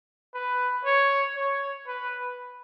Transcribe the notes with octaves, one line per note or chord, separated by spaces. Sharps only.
B4
C#5
C#5
B4